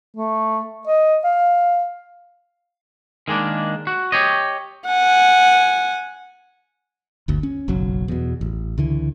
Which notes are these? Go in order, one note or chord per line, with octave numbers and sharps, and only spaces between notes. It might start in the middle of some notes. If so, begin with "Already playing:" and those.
A3
D#5
F5
D#3 G#3 A#3 D4
F#4
G4 C#5 D#5
F#5 G#5
G1 D2
C#4
F#1 B1 F#3
E2 B2
A1
C#2 D3 E3